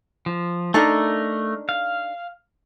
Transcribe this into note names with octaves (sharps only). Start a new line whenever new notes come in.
F3
A3 D4 D#4 A4 A#4
F5